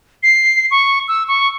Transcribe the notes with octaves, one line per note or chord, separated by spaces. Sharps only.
C7
C#6
E6
C#6